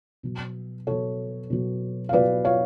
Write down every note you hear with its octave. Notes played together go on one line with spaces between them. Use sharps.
B2 F#3
B2 F#3 A4 C#5
B2 F#3
F5
B2 F#3 B4 D5
C#5 F5